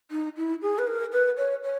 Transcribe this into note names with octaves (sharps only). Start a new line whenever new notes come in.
D#4
E4
G#4
B4
A#4
B4
C#5
C#5